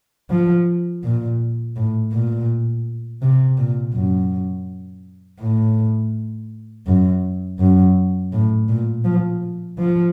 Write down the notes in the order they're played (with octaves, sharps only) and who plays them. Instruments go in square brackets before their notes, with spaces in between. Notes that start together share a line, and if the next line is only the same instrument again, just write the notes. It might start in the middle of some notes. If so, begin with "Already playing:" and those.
[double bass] F3
A#2
A2
A#2
C3
A#2
F#2
A2
F#2
F#2
A2
A#2
F3
F3